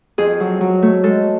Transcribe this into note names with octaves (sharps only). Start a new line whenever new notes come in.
F2 G#4
F#3
F#3
A3
G#3 A4